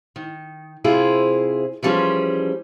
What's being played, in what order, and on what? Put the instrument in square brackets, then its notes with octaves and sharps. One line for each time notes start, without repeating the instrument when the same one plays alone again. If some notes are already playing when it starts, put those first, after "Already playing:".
[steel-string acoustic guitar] D#3
C3 E4 F4 G#4 C5
E3 F3 G3 C#4 G#4 C5